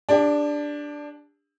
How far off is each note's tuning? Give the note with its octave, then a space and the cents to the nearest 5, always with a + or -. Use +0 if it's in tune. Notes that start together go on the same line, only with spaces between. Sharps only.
D4 +0 G4 +35